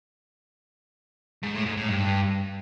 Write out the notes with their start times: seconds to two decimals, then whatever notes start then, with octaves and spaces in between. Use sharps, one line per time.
1.43 G#2
1.54 A2
1.66 G#2
1.77 A2
1.89 G2